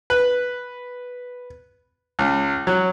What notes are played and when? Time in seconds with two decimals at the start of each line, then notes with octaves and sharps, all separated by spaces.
0.10 B4
2.19 C#2
2.67 F#3